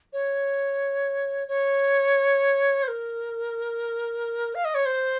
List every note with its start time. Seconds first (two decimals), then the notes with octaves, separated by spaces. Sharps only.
0.13 C#5
1.48 C#5
2.83 C5
2.88 A#4
4.55 F5
4.65 D#5
4.75 C#5
4.86 C5